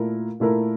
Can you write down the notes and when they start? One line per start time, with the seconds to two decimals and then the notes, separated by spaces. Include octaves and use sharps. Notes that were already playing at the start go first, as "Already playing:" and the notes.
Already playing: A#2 A3 E4 A#4
0.40 A#2 A3 E4 A#4